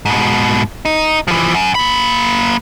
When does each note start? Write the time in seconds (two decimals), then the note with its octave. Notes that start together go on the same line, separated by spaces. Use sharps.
0.05 G#2 B2
0.85 D#4
1.28 E3 F3
1.54 F#2
1.75 A#3 B5